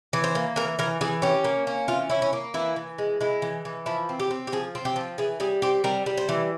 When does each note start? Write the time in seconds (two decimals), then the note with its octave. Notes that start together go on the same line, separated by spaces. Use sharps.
0.13 E3
0.24 C5
0.35 A#3
0.56 E3 A#4
0.79 E3 A#4
1.01 E3 G#4
1.22 C#4 G4
1.44 A#3
1.67 C#4
1.88 E3 F4
2.10 C#4 E4
2.22 C#4
2.33 A#3
2.54 E3 E4
2.76 E3
2.98 G#3
3.21 G#3 E4
3.42 E3
3.65 E3
3.86 F3 E4
4.09 C4
4.20 G4
4.31 C4
4.47 G4
4.52 F3 G#4
4.75 C4
4.85 G4
4.96 F3
5.18 E3 G#4
5.40 G3 G#4
5.62 C4 G4
5.84 G3 A#4
6.06 G3
6.17 C5
6.29 E3